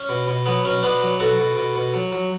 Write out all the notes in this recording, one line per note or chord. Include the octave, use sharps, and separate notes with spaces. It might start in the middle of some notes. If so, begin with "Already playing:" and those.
Already playing: C#4
B2
B2
F#3 B3
B2 C#4
B2 B3 D4
F#3
B2 F#4 A4
B2
B2
B2
F#3
F#3